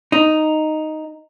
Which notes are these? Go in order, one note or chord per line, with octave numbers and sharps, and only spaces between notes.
D#4